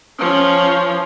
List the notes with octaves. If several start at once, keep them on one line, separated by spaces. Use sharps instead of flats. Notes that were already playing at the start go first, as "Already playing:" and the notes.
F3 C#4